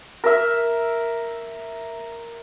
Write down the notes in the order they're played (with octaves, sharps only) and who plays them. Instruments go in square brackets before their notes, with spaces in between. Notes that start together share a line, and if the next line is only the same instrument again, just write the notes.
[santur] A#4 E5